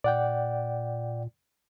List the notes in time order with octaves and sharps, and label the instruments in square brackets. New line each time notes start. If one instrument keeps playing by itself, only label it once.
[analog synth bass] A#2 [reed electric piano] D5 F#5 G5